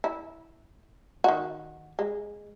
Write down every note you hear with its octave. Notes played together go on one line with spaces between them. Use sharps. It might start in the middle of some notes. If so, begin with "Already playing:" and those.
E4
D#3 F#4
G#3